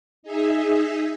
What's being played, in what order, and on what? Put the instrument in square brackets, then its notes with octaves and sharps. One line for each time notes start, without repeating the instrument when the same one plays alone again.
[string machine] D#4 G#4 E5